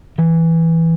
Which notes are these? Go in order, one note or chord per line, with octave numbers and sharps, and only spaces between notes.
E3